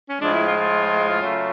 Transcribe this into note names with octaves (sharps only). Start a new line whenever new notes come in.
C#4
A2 F3 G#3 D4
E4
F4
F4
C#3 F#3 A3